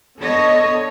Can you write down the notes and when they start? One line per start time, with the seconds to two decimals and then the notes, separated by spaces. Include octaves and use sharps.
0.20 D3 B3 A4 C#5 D#5